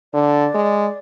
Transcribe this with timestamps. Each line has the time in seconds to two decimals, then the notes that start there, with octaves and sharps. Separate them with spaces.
0.14 D3 D5
0.54 G#3